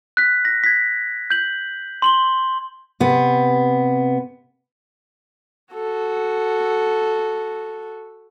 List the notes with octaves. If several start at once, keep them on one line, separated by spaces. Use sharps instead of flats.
F#6 B6
A#6
G#6 B6
G6 F#7
C6 F#7 G7
C3 B3
F#4 A4